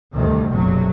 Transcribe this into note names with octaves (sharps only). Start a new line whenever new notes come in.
D2 G2 C3 D#3
F#1 B1 G2 C3 F#3